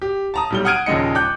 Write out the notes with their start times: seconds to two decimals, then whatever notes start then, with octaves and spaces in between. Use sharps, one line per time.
0.02 G4
0.34 A5 A#5 D#6
0.50 B1 G3 G7
0.65 F#5 D#6 F6 G#6 D7 D#7
0.86 A#1 D#2 C#3 G#3 D#5 C#7
1.15 G5 D6 F#6 G6